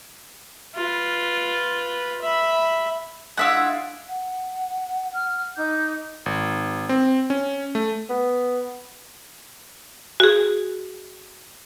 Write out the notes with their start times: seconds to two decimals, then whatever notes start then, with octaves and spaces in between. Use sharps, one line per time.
0.75 F4 B4
2.21 E5 B5
3.37 G#3 D4 E4 F4 E5 F#5
4.09 F#5
5.14 F6
5.56 D#4 D6 G6
6.26 G#1
6.89 C4
7.30 C#4
7.75 A3
8.10 B3
10.20 F#4 G#4